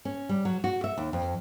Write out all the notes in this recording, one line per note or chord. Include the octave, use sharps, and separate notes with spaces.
C#4
G3
F#3
F#4
E5
D#2
F2